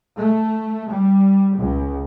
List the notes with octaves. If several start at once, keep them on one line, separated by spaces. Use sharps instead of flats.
A3
G3
C#2